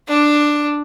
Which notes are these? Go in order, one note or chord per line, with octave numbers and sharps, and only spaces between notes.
D4